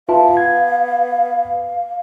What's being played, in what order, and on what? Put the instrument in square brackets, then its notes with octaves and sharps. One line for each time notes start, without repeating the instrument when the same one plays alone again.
[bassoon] B3 [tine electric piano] F4 E5 A5 [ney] F5
[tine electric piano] G#6